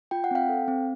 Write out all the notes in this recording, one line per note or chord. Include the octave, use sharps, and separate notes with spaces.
F4 G5
F#5
C4 F5 G5
A4
C4